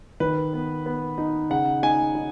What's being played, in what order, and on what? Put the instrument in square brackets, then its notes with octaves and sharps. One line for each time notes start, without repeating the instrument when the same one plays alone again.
[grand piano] D#3 B4
B3
B3
D#4
C#3 F#5
D#4 G#5
D#4